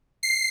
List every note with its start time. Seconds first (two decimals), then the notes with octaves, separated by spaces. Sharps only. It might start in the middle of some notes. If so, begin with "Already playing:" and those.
0.23 C7